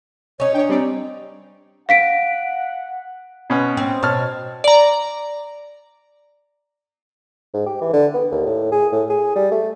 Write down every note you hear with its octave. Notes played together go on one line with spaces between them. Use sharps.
C#4 D#4 C#5
D4 C#5 G5
G3 C4 D5
F5 F#5 B6 D7
B2 C#4 F#5
C4
B2 C#5 A5 F6
D5 A#5
G#2
G4
E3
D3
B3
D#2
A2
G#4
A2
G#4
G3
A3